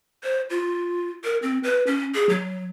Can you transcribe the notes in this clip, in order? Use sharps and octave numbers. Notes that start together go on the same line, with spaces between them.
C5
F4
A#4
C4
B4
C#4
G#4
F#3